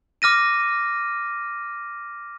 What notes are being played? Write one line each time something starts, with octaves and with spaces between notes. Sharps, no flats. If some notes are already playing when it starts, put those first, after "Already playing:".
D6 F6 A#6 D#7